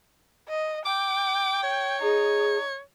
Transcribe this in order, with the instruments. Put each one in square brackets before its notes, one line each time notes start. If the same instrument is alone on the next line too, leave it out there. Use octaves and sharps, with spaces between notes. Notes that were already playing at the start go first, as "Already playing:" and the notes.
[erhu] D#5
[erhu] G5 [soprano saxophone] D6
[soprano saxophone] C#5
[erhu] D#4 [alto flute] G#4